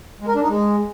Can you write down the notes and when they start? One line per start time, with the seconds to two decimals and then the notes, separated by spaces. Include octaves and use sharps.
0.21 G#3
0.28 A#4
0.35 D4
0.42 D#4
0.49 G#3